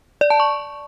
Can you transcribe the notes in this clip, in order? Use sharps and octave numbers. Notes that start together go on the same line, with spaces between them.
D5
A5
C#6